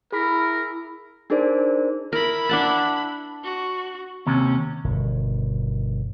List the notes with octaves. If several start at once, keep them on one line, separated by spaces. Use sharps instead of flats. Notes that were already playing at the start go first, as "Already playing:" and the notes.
E4 G#4 A#4 B5 B6
D4 D#4 G#4 A#4 C5 D5
E4 A#4 B5
D4 F#5 A5
F#4
D#2 C3 C#4
G1 B2 D#3